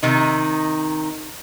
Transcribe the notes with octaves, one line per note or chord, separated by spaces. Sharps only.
C3 D#3 D#4